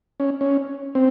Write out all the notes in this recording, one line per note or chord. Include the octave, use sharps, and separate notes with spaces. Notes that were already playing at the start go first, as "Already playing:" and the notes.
C#4
C#4
C4